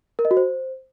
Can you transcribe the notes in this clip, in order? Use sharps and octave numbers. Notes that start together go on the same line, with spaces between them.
A#4
D#5
F#4
C5